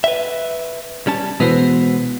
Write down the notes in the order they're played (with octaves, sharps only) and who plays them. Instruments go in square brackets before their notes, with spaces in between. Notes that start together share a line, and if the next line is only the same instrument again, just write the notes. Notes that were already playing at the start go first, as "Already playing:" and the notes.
[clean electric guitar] B4 E5
G3 C#4 A5
[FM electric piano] B2 E3 B3 [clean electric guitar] G#3 F#4 C5